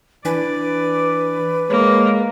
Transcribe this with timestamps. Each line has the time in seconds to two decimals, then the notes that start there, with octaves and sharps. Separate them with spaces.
0.25 E3 D4 B4 D5 G#5
1.70 G#3 A#3 C#5